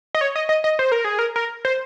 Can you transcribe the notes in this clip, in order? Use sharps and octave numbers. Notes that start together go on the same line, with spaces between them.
D#5
C#5
D#5
D#5
D#5
C5
A#4
G#4
A#4
A#4
C5